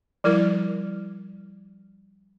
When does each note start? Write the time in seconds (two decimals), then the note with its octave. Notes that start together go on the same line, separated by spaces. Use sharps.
0.24 F3 G3 E4 A#4